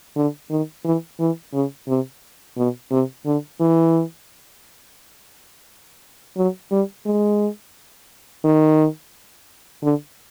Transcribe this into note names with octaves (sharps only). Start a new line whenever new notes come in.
D3
D#3
E3
E3
C#3
C3
B2
C3
D3
E3
F#3
G3
G#3
D#3
D3